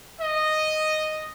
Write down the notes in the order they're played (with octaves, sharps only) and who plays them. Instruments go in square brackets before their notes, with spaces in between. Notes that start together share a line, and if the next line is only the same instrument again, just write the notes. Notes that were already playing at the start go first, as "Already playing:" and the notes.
[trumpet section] D#5